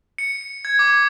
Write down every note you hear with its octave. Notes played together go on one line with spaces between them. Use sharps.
C#7
G#6
D6